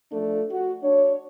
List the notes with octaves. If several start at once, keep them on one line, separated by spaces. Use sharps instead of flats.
F3 A3 D4
F#4
D4 C#5